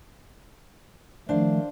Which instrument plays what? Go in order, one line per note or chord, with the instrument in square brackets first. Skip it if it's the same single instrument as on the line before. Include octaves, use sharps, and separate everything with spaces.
[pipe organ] D#3 F3 A3 [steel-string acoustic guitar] D4 C5 F5